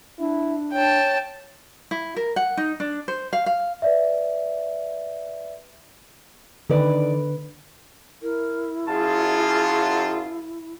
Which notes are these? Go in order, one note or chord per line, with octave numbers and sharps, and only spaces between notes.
D4 E4
C#5 G5 A5
E4
A#4
F#5
D#4
D4
C5
F5
F5
B4 D5 E5
D3 D#3 B4 D5
E4 A#4
F#2 F4 G#4 A5